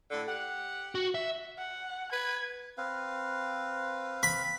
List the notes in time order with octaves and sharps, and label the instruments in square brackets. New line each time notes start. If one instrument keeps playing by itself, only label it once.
[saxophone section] A2 D3
G4 F#5
[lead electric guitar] F#4
E5
[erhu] F#5
[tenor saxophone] B4 [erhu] G#6
[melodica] C4 B4 F5
[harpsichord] B5